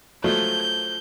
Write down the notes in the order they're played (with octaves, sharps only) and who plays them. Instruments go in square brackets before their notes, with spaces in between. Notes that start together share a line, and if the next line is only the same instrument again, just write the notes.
[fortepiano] F3 F#3 A3 [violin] G6